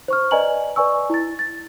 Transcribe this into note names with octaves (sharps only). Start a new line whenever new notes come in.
C5 C#6 F6
B4 D5 D#5 G#5 A#5 F#7
B4 D5 G#5 C#6 E6
E4 A6
A6